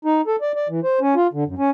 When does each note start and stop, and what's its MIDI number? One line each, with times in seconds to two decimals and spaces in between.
0.05 0.21 63
0.27 0.36 69
0.41 0.52 74
0.56 0.68 74
0.69 0.80 52
0.84 0.99 72
1.01 1.14 61
1.16 1.27 65
1.33 1.44 50
1.47 1.55 42
1.58 1.70 61